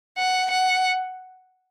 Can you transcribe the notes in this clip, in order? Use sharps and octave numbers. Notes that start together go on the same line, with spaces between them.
F#5
F#5